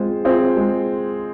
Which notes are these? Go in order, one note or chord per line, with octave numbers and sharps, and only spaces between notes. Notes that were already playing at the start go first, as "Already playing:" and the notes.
Already playing: G#3 C4 F4 G#4 C5
C4 F4 G#4 C5
G#3